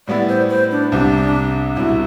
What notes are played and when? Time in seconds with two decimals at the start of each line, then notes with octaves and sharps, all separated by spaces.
0.08 A2 G3 B3 E4 D5
0.29 C5
0.49 C5
0.71 D4
0.92 C2 C3 G3 D4
1.76 C2 B2 G3 E4